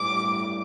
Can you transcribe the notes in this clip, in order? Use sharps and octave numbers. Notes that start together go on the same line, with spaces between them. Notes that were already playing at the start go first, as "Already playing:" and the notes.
Already playing: A1 G2 A3 D6